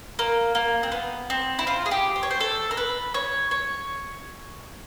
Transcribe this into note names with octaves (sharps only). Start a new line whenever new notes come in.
A#3
A#3
C4
B3
C4
E4
F4
G#4
G4
C5
C#5
C5
A4
A#4
B4
C#5
C#5